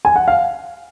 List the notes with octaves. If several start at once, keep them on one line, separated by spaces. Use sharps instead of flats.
G#5
F#5
F5